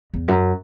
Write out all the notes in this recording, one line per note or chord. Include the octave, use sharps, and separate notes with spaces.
E2
F#2